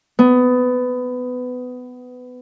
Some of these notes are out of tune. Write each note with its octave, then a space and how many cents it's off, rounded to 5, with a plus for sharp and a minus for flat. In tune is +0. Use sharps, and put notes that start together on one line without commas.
B3 +20